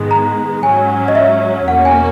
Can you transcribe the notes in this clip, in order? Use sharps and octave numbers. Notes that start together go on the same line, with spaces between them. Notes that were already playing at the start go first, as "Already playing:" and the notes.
Already playing: G#2 D#3 G#3 B3
A#5
G#2 F#3 C#4 G#5
D#5
E5
E2 B2 A#3 C#4 F#4 F#5
G#5